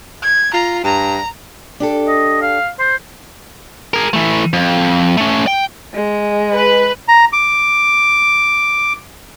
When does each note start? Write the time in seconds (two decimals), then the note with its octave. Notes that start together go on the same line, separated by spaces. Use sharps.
0.22 G#6
0.54 F4 A#5
0.84 G2 A#5
1.80 D4 G4 A4
2.08 D#5
2.42 F5
2.79 C5
3.94 G#4 A#4
4.14 E3 A3
4.53 F2
5.17 A3 C#4
5.47 G5
5.94 G#3
6.55 B4
7.08 A#5
7.33 D6